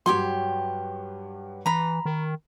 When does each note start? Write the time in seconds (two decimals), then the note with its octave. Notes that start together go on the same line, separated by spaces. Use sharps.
0.06 G2 F#3 G4 C#5 C6
1.66 E3 A#5 B5
2.05 D#3